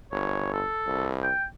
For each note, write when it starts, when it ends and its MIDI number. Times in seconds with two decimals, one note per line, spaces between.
0.11 0.62 31
0.11 0.52 73
0.53 1.08 69
0.86 1.30 36
1.23 1.45 79